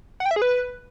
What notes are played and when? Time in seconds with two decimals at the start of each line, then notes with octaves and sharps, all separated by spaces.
0.20 F#5
0.26 G5
0.31 E5
0.36 G#4
0.42 B4